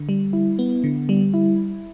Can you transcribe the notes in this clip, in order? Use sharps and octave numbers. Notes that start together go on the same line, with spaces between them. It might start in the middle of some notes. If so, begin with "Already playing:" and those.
Already playing: D3
G3
E4
B3
D3
G3
E4